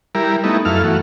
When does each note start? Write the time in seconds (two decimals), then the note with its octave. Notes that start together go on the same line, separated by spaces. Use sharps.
0.15 G3 E4 A#4
0.44 A3 B3 D#4 E4
0.65 F#2 E4 A4 F5 F6
0.84 E3 A3 F#4